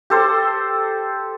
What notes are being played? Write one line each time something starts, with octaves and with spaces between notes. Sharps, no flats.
G4 A4 C5